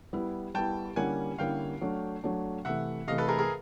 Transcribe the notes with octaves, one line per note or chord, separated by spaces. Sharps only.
G3 B3 E4
G3 B3 E4 G5 A5
D3 G3 A#3 C#4 E4 F#5 G#5
D3 G3 A#3 C#4 E4 F5 G5
F#3 A3 D4
F#3 A3 D4
C3 E3 A3 E5 F#5
C3 E3 A3 D#5 F5
A4 B4
G#4 A#4
G#4 A#4